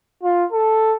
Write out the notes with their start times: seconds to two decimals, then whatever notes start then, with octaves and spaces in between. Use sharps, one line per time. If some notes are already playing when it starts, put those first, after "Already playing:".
0.23 F4
0.52 A4